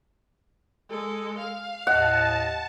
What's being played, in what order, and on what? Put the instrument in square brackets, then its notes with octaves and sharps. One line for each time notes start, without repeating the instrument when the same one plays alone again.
[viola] G#3 A4
F5
[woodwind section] D#2 A2 D#5 [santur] F#5 [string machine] A5